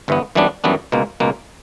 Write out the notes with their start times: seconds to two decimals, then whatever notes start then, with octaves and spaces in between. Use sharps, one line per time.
0.08 G1 G2 E3 B3
0.35 F#2 E3 G3 B3 D4
0.64 F#2 E3 G3 B3 D4
0.92 C#2 B2 A#3
1.20 C#2 B2 A#3